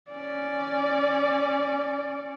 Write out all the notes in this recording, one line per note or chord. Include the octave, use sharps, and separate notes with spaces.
C#4 D5